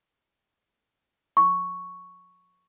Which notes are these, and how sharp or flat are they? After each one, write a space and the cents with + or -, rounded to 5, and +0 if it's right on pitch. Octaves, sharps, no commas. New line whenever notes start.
C#6 +5